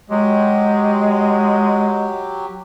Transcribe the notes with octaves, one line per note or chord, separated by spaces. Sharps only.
F#3 G#3 G4